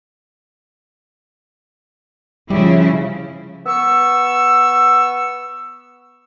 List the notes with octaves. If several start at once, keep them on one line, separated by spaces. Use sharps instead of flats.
C#3 F3 G3 E4
B3 C#6 E6